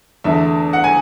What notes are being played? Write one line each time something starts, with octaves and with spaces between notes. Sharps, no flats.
E2 D3 A3 E5
F#5
G#5